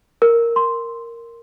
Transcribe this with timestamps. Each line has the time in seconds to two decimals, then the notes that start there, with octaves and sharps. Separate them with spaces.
0.22 A#4
0.56 C6